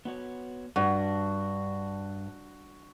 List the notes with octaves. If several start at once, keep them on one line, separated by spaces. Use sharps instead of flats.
B3 F#4 C#5
G2 D4 F#4